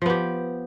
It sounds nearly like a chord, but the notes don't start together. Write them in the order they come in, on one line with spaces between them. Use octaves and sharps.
F3 B3 G4